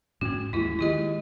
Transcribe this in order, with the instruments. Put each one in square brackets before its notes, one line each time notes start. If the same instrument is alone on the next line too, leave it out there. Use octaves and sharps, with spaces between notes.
[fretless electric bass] G#2 C#4 [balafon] A#3 F#4
[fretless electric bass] D#2 G#3 [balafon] E4 F4
[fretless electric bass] D#3 G#3 [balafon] E4 G4 D#5